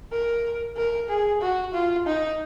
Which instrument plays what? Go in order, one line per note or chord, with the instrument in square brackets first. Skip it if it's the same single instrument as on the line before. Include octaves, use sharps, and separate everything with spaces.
[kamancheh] A#4
A#4
G#4
F#4
F4
D#4